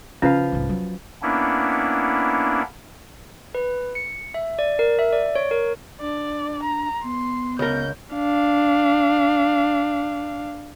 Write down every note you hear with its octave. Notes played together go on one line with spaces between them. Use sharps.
C#3 F3 C#4 B4 F5
C2 G#2
F#3
A#3 B3 C#4 D4 E4
B4
C#7
E5
D5
A#4
E5
D5
C#5
A#4
D4 D5
A#5
B3 C6
C#2 A#4 G6
D4 F5